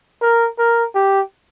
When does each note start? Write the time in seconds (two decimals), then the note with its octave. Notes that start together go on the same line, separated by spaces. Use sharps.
0.22 A#4
0.58 A#4
0.95 G4